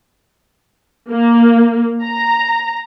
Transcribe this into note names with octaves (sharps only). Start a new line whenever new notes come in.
A#3
A#5